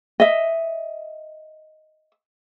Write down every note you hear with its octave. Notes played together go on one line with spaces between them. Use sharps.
D#5 E5